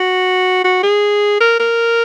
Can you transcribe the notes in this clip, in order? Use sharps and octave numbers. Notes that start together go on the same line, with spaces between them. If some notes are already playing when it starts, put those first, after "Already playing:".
Already playing: F#4
F#4
G#4
A#4
A#4